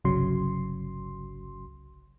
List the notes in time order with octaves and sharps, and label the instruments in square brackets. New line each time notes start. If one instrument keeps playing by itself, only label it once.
[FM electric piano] G1 C2 C#3 F#3 C6